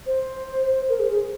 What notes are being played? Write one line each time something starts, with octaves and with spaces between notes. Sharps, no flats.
C5
A#4
G#4
G#4